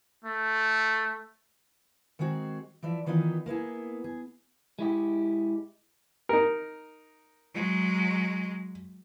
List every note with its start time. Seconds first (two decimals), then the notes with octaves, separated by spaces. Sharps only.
0.24 A3
2.19 D#3 G#3 C4 F#4 G#4
2.83 E3 F3 D5 E5
3.06 D#3 E3 B3 D#4 F4
3.46 A#3 B3 E4 G#4
4.04 G#4
4.79 G#3 E4 G4
6.29 D#4 A#4
7.55 F#3 G#3